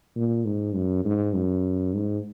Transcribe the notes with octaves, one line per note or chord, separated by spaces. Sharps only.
A#2
G#2
F#2
G#2
F#2
G#2